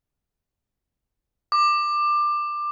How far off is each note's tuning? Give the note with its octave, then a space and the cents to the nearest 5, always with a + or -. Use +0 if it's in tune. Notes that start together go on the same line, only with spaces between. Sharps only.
D6 +20